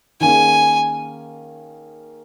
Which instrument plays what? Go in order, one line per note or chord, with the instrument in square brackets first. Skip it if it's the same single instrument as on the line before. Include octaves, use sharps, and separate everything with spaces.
[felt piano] D#3 A#3 C#4 G#4 [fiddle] G#5